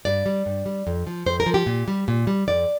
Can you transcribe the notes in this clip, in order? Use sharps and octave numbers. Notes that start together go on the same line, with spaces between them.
G2 D5
G3
G2
G3
F2
F3
F2 C5
A#4
F3
G4
A#2
G3
A#2
G3
F2 D5